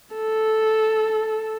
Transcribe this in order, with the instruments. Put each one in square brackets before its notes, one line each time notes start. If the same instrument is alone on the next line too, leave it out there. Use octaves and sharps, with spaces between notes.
[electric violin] A4